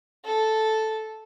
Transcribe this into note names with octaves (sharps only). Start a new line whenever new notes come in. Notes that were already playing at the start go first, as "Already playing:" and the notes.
A4